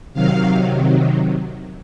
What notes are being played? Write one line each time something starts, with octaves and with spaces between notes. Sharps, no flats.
C3 D#3 F#3 F5